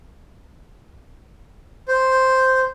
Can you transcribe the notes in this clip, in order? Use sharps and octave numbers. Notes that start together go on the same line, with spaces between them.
C5